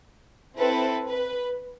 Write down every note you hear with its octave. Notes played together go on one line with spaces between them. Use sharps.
C4 E4 A4 B4
B4